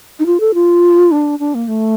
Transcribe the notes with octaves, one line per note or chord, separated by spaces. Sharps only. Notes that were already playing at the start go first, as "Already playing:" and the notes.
D#4
F4
A4
F4
D4
D4
A#3
A3